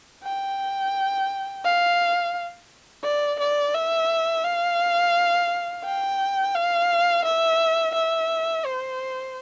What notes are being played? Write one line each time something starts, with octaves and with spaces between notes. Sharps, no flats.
G5
F5
D5
D5
E5
F5
G5
F5
E5
E5
C5